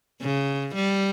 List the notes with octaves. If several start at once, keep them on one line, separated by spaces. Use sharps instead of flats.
C#3
G3